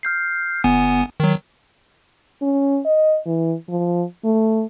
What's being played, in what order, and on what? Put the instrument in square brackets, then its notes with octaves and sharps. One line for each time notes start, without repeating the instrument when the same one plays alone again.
[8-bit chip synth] F6 G6 C7
G1 B3 G#5
D#3 F#3
[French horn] C#4
D#5
E3
F3
A3